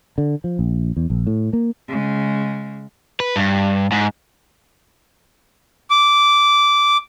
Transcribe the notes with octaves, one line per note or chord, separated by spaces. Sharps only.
D3
F3
A#1
E2
A#1
A2
A#3
C#3 G#3
B4
G2
G#2
D6